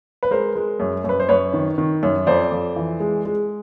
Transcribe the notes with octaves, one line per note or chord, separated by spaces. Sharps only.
B4
G#3 A#4 C5
G#3
F#2
F#2 B4
C5
F#2 B4 C#5
D#3
D#3
F#2
F2 C5 D5
F2
E3
G#3
G#3